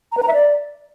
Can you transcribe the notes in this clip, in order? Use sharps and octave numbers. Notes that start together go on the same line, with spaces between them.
A#5
B4
A#5
E5
D5